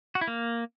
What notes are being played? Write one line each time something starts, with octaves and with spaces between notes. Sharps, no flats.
F#4
E4
A#3